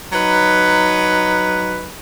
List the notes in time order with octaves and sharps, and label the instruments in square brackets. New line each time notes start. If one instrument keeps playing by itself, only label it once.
[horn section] F#3 D#4 B4